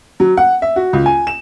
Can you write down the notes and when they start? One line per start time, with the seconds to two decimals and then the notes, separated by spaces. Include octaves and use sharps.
0.20 F#3
0.37 F#5
0.62 E5
0.76 F#4
0.93 C#2
1.06 G#5
1.27 E7